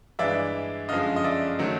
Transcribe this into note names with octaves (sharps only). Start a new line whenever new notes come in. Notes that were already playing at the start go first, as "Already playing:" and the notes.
G2 E3 G#3 D5 E5
F#2 D3 F3 G#3 D#5 F5
D#5
D5 E5
D#3 F#3 A3